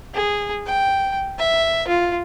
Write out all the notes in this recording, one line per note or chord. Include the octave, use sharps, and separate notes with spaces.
G#4
G5
E5
F4